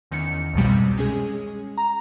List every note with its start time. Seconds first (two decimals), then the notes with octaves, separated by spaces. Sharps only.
0.11 E2 D#3 C#4 C#7
0.54 C2 F2 G#2 B2 G3
0.68 C3
0.98 G#3 C#4 G#4
1.78 A#5